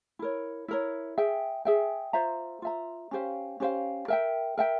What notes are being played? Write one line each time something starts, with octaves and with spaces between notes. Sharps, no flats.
E4 A#4 C#5
E4 A#4 C#5
G#4 E5 G5
G#4 E5 G5
F4 C5 E5 A#5
F4 C5 E5 A#5
C#4 G4 C5 F5
C#4 G4 C5 F5
A#4 E5 G5
A#4 E5 G5